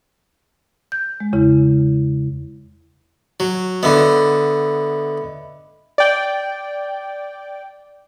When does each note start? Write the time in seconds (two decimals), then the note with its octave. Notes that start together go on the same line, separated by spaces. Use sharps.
0.92 G6
1.20 G#3
1.33 E2 C#3 E4
3.40 F#3
3.83 D3 B3 D#5 E5 B5
5.98 D5 G5